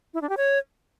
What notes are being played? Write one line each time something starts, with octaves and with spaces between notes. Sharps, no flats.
E4
D4
G4
C#5